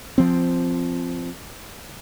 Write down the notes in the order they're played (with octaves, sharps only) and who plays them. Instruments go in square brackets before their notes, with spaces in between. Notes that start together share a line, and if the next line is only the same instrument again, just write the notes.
[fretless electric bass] F3 C4